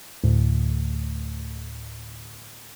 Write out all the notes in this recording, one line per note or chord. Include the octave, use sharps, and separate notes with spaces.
D2 A2